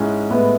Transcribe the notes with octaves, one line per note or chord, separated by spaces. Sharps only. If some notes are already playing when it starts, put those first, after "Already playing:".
Already playing: G#2 G#3 C#4 E4
A2 G#3 B3